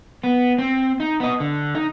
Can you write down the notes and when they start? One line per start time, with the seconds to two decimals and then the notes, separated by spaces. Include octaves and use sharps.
0.24 B3
0.58 C4
1.00 D#4
1.20 B3 D#5
1.40 D3
1.75 D#4